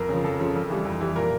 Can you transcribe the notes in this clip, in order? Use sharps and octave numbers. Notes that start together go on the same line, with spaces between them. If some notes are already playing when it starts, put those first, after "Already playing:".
Already playing: F2 A#4
C#3 F3
F2 A4
C#3 F3
F2
E3 G3
F2
E3 G3
A#2 A#4